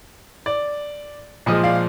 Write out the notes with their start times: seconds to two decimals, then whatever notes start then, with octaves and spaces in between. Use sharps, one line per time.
0.46 D5
1.46 A#2 F3 G#3 D#5
1.63 D5 F5